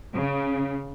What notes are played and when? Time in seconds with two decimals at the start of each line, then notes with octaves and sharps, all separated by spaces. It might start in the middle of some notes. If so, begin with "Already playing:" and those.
0.14 C#3